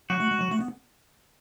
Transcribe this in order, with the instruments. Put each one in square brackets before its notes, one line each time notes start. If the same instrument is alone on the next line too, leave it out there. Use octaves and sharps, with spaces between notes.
[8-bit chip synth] F#3 [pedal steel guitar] F#4
[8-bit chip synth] A3
G#3
F#3
A3
B3